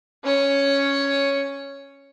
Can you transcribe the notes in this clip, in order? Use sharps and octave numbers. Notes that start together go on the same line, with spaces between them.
C#4 C#5